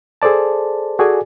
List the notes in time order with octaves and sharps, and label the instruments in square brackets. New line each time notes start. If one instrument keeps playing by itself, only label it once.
[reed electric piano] G#4 A4 C5 D5 A5
F#4 G#4 A4 D5 G#5